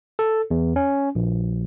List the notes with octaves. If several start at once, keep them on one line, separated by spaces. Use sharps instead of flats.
A4
E2
C#4
A#1